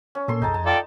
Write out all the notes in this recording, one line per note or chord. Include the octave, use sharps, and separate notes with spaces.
C#4
A#2 A#3 A4 C6
C2 F#2 D#4 G#4 A5
F2 A5
F4 A4 D5 G5